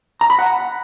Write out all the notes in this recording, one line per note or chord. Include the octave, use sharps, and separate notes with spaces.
A#5
B5
F#5